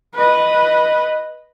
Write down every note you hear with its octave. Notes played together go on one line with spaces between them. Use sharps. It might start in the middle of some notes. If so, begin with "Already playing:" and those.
B4 D#5